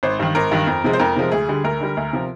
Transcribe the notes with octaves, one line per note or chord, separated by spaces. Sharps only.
G#1 C5
G2 D#3
G#1 A#4
G2 D#3
F2
C3 F3 G#3
C5
F2 A#4
C3 F3 G#3
D2 G#4
D3 G3
D2 A#4
D3 G3
D2
C3 F3